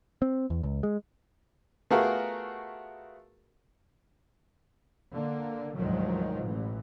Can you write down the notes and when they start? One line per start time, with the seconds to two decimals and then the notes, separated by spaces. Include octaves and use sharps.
0.22 C4
0.50 E2
0.63 C#2
0.83 G#3
1.91 A3 B3 F4 F#4 G#4 A#4
5.13 D3 A#3
5.76 D2 G#2 B2 D#3 F3 F#3
6.43 A1 E3